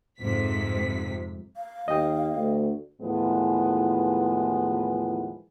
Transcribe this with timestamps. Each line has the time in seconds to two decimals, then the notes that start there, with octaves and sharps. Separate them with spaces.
0.19 F2 G#2 C3 B6
1.57 F5
1.88 D#2 D#5 G5
2.36 D2
3.02 D#2 A2 E3 F3 G#3 B3